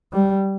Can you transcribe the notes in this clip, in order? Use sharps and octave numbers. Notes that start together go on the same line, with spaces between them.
G3